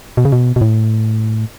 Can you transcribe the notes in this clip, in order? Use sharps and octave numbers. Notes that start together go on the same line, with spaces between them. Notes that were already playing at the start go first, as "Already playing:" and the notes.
B2
C#3
B2
B2
A2